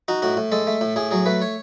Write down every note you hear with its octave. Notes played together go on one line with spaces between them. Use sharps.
D#4 F#4
A2 F#4
A2
G#3 A4
A3
A2
A2 G#4
F#3 G#4
A3 B4
C#5